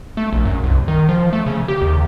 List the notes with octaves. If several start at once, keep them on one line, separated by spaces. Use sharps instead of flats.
A3
A#1
F#2
C2
D#3
F3
A3
C#3
G4
D#2